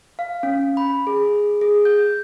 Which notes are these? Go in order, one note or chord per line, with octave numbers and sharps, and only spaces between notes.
F5
C#4
B5
G#4
G#4
G6